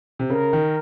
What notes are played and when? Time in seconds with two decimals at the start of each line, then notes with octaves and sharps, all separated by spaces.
0.19 C3
0.30 C#3 A#4
0.53 D#3